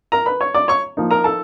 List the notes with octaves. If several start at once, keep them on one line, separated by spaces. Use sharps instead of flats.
A#4 A#5
B4 B5
C#5 C#6
D5 D6
C#5 C#6
F3 A#3 D#4
A#4 A#5
A4 A5